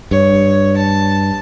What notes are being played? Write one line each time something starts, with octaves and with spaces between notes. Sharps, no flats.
G2 C#5
A5